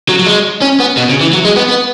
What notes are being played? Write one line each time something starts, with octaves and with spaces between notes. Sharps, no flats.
F#3
F#3
G#3
C#4
B3
B2
C#3
E3
F#3
G#3
B3
B3